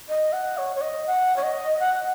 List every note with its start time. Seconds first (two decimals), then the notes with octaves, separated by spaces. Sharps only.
0.09 D#5
0.33 F#5
0.58 C#5
0.76 C#5
0.81 D#5
1.07 F#5
1.36 C#5
1.43 D#5
1.80 F#5